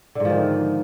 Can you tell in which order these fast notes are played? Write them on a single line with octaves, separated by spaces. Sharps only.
D3 G#2 F3 D#3